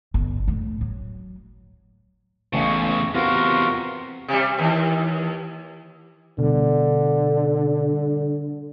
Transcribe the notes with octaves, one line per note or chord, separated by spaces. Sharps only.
G1
A2
F#3
A1 E2 C#3 C#6
E2 C3 F4 F#4 A#4 F5
C3 G3
D#2 E3
B2 D3 G3